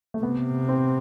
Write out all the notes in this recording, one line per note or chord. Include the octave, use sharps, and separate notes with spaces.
A3
C3 B3
C4